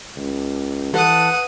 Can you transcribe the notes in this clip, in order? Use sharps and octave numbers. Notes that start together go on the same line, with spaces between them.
C#2
E3 A4 B4 F#5 D#6